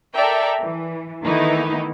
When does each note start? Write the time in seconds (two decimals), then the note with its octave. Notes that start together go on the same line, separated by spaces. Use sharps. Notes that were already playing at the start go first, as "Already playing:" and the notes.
0.14 A4 A#4 D5 E5 G5 A#5
0.61 E3
1.24 D#3 E3 A3 B3 D#4 E4